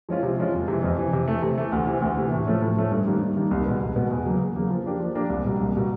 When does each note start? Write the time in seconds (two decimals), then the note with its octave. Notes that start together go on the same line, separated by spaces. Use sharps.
0.09 F3 G#3 C#4 F4
0.23 C3
0.38 F3 G#3 C#4 F4
0.53 F2
0.68 C3 E3
0.83 F2
0.98 C3 E3
1.13 C3
1.28 E3 A3
1.42 C3
1.58 E3 A3
1.72 D2
1.87 C3 E3
2.02 D2
2.17 C3 E3
2.32 A2
2.47 F3 A3 C#4
2.62 A2
2.77 F3 A3 C#4
2.91 G2
3.07 D#3 G3 A#3
3.21 G2
3.36 D#3 G3 A#3
3.51 C2
3.65 B2 G#3 B3
3.81 C2
3.96 B2 G#3 B3
4.11 E2
4.26 C#3 F#3 A#3
4.41 E2
4.56 C#3 F#3 A#3
4.70 F3
4.85 A#3 D4 G4 A#4
5.00 F3
5.15 A#3 D4 G4 A#4
5.30 C2
5.45 B2 G3 A#3
5.60 C2
5.75 B2 G3 A#3